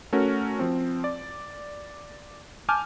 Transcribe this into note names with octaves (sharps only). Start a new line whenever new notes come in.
A3 C#4 F#4 A#4
F3 C4
D5
G#5 A5 D6 F6 G6